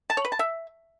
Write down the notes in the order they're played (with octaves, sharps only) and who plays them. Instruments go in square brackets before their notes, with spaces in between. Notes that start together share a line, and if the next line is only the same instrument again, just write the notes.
[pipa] A5
C#5
B4
A5
E5